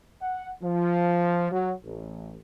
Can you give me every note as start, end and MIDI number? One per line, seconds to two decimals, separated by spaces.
0.21 0.49 78
0.62 1.51 53
1.52 1.72 54
1.84 2.37 33